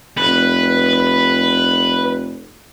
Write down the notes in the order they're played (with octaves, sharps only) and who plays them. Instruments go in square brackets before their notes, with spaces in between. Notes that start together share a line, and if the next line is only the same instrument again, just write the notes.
[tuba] F1 [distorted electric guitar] B4